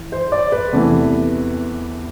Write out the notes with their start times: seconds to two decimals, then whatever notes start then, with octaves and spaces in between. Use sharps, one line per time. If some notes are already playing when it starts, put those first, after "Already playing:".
Already playing: E3
0.12 C5
0.32 D5
0.52 B4
0.73 E2 C3 E3 A3